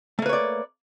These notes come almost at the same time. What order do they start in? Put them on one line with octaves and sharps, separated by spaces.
A3 A#3 B4 C#5 D5